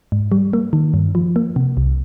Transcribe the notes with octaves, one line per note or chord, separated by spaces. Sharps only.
G#2
G3
A#3
D#3
G2
F3
A#3
C3
C2